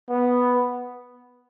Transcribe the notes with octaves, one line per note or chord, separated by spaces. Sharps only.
B3